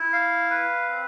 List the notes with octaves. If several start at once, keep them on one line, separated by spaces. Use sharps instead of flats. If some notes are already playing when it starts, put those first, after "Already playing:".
Already playing: E4
F5
B4
C4